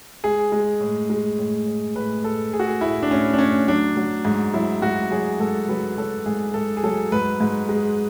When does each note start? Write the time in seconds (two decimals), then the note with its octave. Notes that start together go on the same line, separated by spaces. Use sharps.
0.24 G#3 G#4
0.52 G#3
0.80 A2
1.10 G#3
1.38 A2
1.67 A2
1.95 A2 B4
2.24 A2 A4
2.53 A2 G#4
2.60 F#4
2.67 G#4
2.81 A2 E4
3.03 D4
3.11 A2 C#4
3.33 D4
3.38 A2 C#4
3.68 F#3 D4
3.97 F#3
4.25 G#2
4.54 F#3 E4
4.82 G#2 F#4
5.11 F#3 G#4
5.40 G#2 A4
5.68 F#3 B4
5.98 F#3 A4
6.26 G#2 G#4
6.54 G#2 A4
6.77 G#4
6.83 F#3 A4
7.12 G#2 B4
7.40 G#2
7.69 G#3